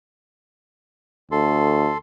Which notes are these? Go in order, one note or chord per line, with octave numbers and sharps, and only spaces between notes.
D2 A4 C6